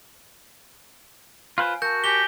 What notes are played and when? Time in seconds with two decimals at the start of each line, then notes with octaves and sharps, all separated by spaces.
1.58 F4 B4 C5 F5 G#5
1.82 F#4 A#4 A5 G6
2.04 G4 G#5 A#6 B6 G7